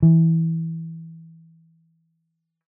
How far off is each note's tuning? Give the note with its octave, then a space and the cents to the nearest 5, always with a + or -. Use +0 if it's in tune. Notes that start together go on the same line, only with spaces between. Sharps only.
E3 -10